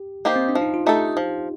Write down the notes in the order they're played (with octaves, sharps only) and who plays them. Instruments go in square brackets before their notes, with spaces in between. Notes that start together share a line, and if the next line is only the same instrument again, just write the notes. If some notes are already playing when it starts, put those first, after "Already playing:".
Already playing: [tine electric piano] G4
[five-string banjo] A#3 D#4 G4 C5
[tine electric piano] C4
D4
[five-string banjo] F3
[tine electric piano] D#4
F4
[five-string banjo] A3 D#4 A4 [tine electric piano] G4
[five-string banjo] F3